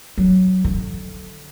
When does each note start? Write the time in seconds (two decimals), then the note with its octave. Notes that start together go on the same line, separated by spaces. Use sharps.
0.18 F#3
0.64 D3